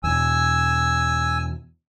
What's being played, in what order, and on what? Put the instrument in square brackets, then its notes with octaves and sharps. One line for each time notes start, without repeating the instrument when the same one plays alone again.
[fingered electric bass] E2 B2 [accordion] G#5 E6